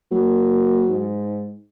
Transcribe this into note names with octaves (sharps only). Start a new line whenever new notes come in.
F#3 A#3
G#2